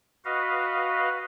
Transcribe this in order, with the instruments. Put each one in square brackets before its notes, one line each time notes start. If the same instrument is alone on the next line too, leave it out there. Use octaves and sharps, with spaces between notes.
[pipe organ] F#4 B4 D#5 F5